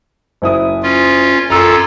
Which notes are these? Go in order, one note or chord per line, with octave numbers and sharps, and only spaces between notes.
F#1 E4 D#6
C#4 F4
F#2 F4 A4 A#5 E6